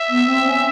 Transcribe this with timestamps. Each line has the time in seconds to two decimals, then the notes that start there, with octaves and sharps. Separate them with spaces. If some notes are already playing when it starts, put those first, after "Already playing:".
Already playing: E5
0.09 B3
0.26 C4
0.45 C#4